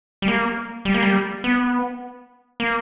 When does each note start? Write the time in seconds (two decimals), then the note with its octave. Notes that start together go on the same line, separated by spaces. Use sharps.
0.22 G3
0.28 A#3
0.85 G3
0.94 A#3
1.03 G3
1.44 B3
2.60 A#3